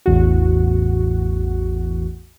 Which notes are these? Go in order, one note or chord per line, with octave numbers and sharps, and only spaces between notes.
A1 E2 F#4